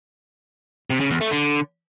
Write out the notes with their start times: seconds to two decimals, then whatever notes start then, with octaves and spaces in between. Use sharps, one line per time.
0.90 C3
1.00 C#3
1.11 E2
1.21 A3
1.31 D3